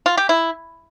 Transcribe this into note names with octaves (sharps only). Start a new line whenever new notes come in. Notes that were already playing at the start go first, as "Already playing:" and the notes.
F4
G4
E4